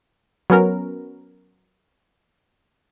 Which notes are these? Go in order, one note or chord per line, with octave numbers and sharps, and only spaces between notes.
F#3 B3 C#4 A#4